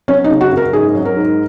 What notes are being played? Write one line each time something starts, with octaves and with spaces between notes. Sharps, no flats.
F#3 C#4
D#4
C#3
F#4
F#2
A#4
G#2 G#4
F#3
A#4
G#2